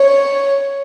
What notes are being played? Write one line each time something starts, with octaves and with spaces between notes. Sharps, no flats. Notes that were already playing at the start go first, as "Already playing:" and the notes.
Already playing: C#5